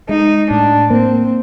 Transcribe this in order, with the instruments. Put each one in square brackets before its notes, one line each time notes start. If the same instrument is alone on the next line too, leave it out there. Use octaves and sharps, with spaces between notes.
[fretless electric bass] G#3 [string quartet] D#4
[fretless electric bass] A2 [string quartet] D4
[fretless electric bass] A#3 [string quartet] C4